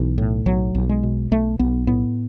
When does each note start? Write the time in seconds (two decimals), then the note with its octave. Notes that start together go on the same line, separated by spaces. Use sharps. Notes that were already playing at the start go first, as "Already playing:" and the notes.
Already playing: B1 E3
0.18 A2
0.46 B1 F#3
0.75 B1
0.89 G#3
1.03 B2
1.31 B1 A3
1.59 B1 B3
1.87 A2 B3